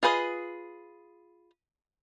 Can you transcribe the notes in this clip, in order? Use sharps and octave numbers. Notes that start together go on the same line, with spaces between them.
F4 G#4 B4 C5 D#5